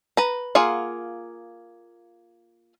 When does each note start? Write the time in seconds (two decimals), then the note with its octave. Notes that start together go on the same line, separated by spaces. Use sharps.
0.17 B4 A#5
0.55 A#3 F4 G#4 F#5